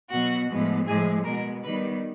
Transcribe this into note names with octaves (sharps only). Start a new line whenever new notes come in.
B2 F#3 B3 F#4 F#5
A2 F3 G#3 B3
A2 F3 G#3 G#4 G#5
B2 G#3 B3 A#4 A#5
D#3 G3 B3 B4 B5